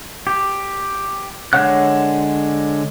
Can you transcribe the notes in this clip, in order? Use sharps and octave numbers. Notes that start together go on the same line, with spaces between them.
G4
D3 G#3 C#5 F#5 F#6